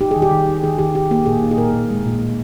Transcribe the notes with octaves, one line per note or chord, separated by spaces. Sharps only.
D#4 G4
G#4
D#3
G4
D#3
D#4
D#3 G#4
D#3 G4
D#3 G4
A#3 G4
A#2 G#4
D#4
G#4
A#2 A#4
A#2
G#3
A#2
A#2